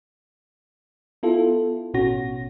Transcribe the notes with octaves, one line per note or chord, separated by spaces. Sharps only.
B3 E4 F4 A4
A1 B2 C#4 F#4 A#6